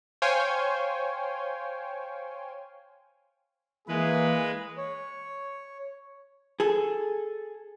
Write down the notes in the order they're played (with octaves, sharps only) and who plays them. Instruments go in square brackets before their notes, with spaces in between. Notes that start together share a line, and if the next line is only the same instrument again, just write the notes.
[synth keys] C5 C#5 F5 G5 G#5
[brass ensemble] E3 A#3 G#4 [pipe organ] G#3 B4
[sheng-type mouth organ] C#5
[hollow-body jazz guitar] G#4 A4